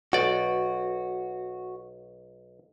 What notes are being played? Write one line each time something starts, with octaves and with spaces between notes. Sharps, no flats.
B1 F#4 D5